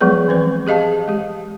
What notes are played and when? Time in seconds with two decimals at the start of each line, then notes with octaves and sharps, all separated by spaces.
0.01 F3 F#3 G#3 B3 G#4 B4
0.28 E3 C4 B4 C5
0.67 G4 G#4 D#5 F5 A5
1.08 G#3 G4